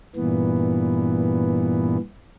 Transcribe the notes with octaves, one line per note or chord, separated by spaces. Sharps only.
G2 A#2 E3 B3